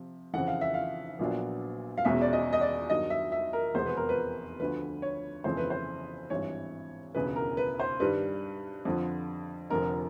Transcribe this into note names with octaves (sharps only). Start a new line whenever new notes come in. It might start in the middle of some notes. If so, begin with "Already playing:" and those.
Already playing: C3 F3
F2 C#3 E3 F#5
F5
E5
F5
A#1 A#2 F#3 B3 D4
F5
E1 E2 B2 G#3 C#4 E5
D5
D#5
D#5
D5
G2 D#3 F#3 D#5
E5
E5
A#4
F1 E2 B2 G#3 B3 C5
B4
A#4
B4
D2 D3 F3 B4
C#5
G1 F2 C#3 E3 A3 C5
B4
C5
G#1 G2 E3 C#5
E1 D2 C#3 E3 B4
A#4
B4
C5
G2 D#3 G3 B4
F2 D3 F3
F1 F2 D3 A#4